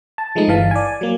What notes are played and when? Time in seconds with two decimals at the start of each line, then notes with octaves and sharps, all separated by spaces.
0.18 A5
0.35 F3 G#3 A3 D#4
0.48 G1 E3 F5 A5
0.71 D5 G#5
1.01 F#3 A#3